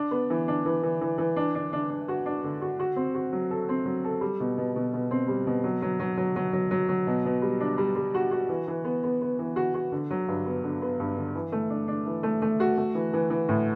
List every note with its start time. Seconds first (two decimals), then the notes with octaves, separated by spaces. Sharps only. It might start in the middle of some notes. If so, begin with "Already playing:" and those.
Already playing: D4
0.11 B3
0.30 E3
0.48 D4
0.66 E3
0.83 E3
1.01 E3
1.18 E3
1.36 D4
1.55 D4
1.73 D4
1.90 D4
2.08 F#4
2.26 D4
2.44 D3
2.62 F#4
2.79 F#4
2.96 C4
3.15 F#4
3.33 F#3
3.51 A4
3.69 C4
3.85 F#3
4.04 A4
4.21 G3
4.40 B2
4.58 B2
4.76 B2
4.94 B2
5.11 C4
5.28 G3
5.47 B2
5.64 F#3
5.82 F#3
6.00 F#3
6.17 F#3
6.36 F#3
6.53 F#3
6.71 F#3
6.89 F#3
7.07 B2
7.25 B2
7.42 G3
7.60 D4
7.78 G3
7.95 G3
8.14 F#4
8.31 F#4
8.49 E3
8.68 E3
8.84 B3
9.04 B3
9.21 B3
9.39 E3
9.56 F#4
9.74 F#4
9.92 D3
10.10 F#3
10.28 G2
10.46 B3
10.64 D3
10.82 B3
11.00 G2
11.17 D3
11.35 E3
11.52 A3
11.70 D4
11.88 D4
12.06 E3
12.23 A3
12.42 A3
12.60 F#4
12.77 A3
12.94 E3
13.13 E3
13.30 E3
13.49 A2